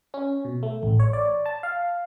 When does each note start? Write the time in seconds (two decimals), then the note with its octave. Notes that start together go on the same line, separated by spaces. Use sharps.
0.14 C#4
0.45 B2
0.63 A3
0.83 A1
1.00 C#5
1.13 D5
1.46 A5
1.63 F5